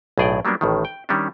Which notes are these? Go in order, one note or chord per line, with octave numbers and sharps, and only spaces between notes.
B1 A2 G#4 D5 G5
F#3 G3 A#3 B3 D4
A1 A2 D#3
G5
D#3 G3 C#4 D4